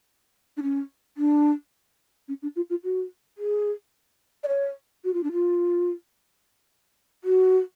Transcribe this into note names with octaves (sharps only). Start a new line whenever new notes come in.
D4
C#4
D4
C#4
D4
F4
F4
F#4
G#4
D5
C#5
F#4
F4
D4
F4
F#4